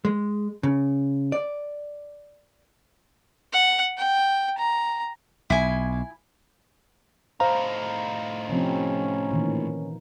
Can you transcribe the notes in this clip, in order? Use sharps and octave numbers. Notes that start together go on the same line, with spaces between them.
G#3
C#3
D5
F#5
G5
A#5
B1 E4 G#5
A2 D#4 C5 F5 A#5
C3 F3 C4 C#4
A#2 D#3 E3